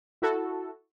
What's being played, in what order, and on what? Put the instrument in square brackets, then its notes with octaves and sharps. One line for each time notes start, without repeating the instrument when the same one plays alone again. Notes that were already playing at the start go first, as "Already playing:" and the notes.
[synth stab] E4 F#4 A4